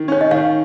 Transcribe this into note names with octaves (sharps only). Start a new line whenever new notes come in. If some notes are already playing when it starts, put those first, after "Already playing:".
Already playing: D#3
C#4 C#5
D#5
D#3 C#5 F5